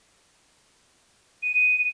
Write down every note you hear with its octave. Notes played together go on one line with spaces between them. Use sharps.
D#7